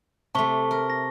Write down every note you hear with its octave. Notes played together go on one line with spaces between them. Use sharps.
C3 A3 A5 C#6 G7
A#4
A#6